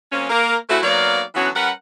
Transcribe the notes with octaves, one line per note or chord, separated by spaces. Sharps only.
F#3 A#3 C4 C#4
A#3 A#4
C#3 A3 C4 E4 F#4
F#3 A#3 B3 D#4 D5 F5
D3 E3 F#3 B3 C#4 F#4
G3 C#4 A#4 B4 F#5